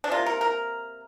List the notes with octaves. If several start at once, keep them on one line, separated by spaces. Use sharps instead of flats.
D4
C3 A#3 F4
A#4
A#4